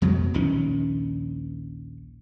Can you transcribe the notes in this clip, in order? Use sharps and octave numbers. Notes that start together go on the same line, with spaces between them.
F2 B2 F#3
A#1 D#2 D#3 C#4